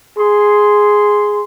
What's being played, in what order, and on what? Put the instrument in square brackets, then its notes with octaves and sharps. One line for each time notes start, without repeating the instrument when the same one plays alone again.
[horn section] G#4 C6